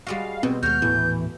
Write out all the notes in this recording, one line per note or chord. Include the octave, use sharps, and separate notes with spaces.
G3 G#3 F#4 F5
B2 C4
D#2 G#3 F#4 C#5 F6 G6
D#1 A2 E3 A3 B3